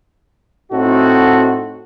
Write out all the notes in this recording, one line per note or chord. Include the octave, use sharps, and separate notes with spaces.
A2 C4 D#4 F#4 A4